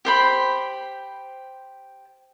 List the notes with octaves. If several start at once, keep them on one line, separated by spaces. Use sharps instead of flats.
G4 C5 B5